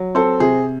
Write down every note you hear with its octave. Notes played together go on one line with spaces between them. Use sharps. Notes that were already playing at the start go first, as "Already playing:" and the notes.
Already playing: F#3
C4 A4
C3 G#4